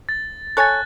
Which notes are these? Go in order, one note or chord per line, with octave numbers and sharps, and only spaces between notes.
A6
A4 C#5 G#5 F#6 A6